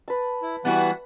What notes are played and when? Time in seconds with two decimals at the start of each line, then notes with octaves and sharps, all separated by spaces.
0.08 B4 A5
0.42 E4
0.65 E3 G3 B3 E4 F#4 F#5